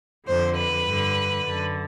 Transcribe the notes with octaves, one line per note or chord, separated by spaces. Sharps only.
F2 D3 C5
B4
G2 D3
F#2 D3